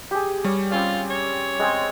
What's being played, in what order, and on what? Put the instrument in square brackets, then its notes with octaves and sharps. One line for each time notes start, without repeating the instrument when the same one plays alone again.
[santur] G4 G#4
[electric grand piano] G3 [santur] C#5
[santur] C4 C#4 [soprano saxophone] F4
[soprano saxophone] C#5
[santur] G#3 C4 G#4